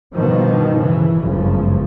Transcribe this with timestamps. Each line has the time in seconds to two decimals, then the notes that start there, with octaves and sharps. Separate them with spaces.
0.14 G2 B2 D3 D#3 F3
0.76 C#3 E3
1.19 G1 C#2 F#2 C#3 F3